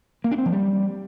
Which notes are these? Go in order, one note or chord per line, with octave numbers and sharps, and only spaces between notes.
A#3
D4
C4
F3
G3